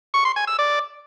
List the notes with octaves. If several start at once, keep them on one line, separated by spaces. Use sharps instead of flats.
C#6
C6
G#5
E6
D5